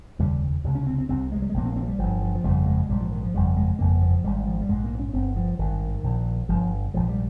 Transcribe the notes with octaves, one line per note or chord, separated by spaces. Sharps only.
F1 D#2 C#3 G3
C#2 C3
C#4
C4
C4
C2 C3 C4
G#3
G3
G#3
A#1 A#2 A#3
C4
A#3
C4
F3
G3
G1 G2 F3
F3
F3
G1 F2 C#3 G3
G#3
A#1 G#2 G3
F3
D#3
F3
G1 F2 C#3 G3
G#3
G1 F2 C#3 A#3
F3
G#1 G#2 G3
F3
G3
A#1 G#2 G#3
A#3
C#4
G1 G2 C4
F3
G#1 G2 D#3
A#1 A#2
G1 G2 F3
A#1 G#2 F3
G3